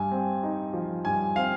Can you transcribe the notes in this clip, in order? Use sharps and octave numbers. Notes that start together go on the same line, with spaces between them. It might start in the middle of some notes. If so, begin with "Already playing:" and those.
Already playing: G2 G#5
C4
D#4
F3
G2 G#5
C4 F5